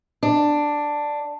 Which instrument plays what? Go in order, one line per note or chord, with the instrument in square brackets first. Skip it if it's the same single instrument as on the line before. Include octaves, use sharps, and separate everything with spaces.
[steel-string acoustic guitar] D4